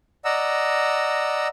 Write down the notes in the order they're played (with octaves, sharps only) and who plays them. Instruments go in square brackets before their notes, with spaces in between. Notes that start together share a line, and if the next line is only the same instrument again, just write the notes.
[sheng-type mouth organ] D5 D#5 F#5 A#5 E6